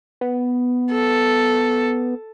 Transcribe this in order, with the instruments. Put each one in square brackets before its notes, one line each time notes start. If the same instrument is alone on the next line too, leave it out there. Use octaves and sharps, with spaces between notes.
[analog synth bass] B3
[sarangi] A4